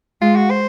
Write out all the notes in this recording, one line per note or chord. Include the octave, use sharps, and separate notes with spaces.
G#3 F4
F#4
C5